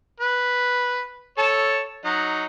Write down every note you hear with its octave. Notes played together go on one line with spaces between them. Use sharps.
B4
A4 C#5 A5
F#3 D#4